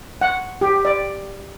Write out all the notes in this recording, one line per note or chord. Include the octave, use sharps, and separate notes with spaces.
F#5
G4
D5